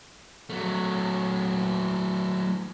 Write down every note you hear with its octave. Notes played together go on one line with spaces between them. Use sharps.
F#3 A3